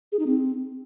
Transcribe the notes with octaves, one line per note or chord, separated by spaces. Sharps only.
G#4
D#4
C4